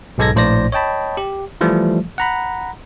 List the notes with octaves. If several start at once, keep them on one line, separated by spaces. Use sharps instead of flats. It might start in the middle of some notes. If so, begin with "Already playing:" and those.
B1 G#2 G#3 A4 G#6 A#6
A#1 A2 C5 D5 A#6
C#5 D#5 G5 A5 B5
G4
E3 F3 G3 A3
F#5 A#5 B5